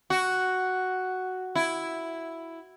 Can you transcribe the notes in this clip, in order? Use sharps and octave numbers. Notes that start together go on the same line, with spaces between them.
F#4
E4